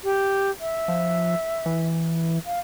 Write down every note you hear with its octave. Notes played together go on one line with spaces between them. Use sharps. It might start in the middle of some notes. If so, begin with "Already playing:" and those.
G4
E5
F3
E3
F5